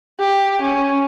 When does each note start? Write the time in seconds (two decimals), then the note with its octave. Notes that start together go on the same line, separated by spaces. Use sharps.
0.19 G4
0.62 C#4